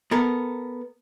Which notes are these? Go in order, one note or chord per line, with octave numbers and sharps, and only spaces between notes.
B3 A4 A#4